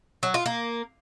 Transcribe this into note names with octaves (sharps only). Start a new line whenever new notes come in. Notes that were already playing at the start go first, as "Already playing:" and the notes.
F#3
F4
A#3